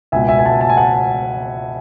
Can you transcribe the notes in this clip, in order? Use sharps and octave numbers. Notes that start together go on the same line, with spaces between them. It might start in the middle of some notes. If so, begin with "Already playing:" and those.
C#2 B2 E5 G#5
E5 G#5
G#5
F#5 A5
A5
G#5
F#5 A5